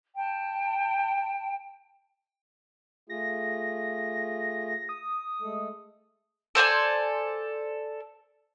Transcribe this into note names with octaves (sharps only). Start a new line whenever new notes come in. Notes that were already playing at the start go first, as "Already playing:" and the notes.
G5 A5
A3 F4 G#4 A#6
D#6
G#3 A3 A4
A4 C5 D5 G#5